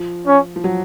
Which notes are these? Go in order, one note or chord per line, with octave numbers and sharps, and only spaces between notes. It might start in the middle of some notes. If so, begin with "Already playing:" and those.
Already playing: F3
C#4
F3
F#3